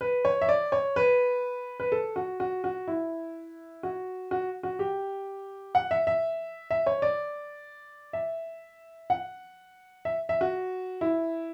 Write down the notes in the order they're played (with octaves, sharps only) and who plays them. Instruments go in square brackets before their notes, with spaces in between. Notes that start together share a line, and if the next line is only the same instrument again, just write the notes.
[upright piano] B4
C#5
E5
D5
C#5
B4
B4
A4
F#4
F#4
F#4
E4
F#4
F#4
F#4
G4
F#5
E5
E5
E5
C#5
D5
E5
F#5
E5
E5
F#4
E4